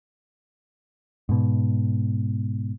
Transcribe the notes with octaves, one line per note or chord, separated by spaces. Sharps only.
G#2 B2